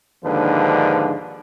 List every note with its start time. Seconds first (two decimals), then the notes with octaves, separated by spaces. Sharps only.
0.24 D#2 G#2 D3 F3 D4 B4